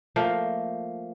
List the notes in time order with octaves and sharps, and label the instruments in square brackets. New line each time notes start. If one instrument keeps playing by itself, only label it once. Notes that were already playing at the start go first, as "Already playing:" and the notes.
[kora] F3 A3 A#3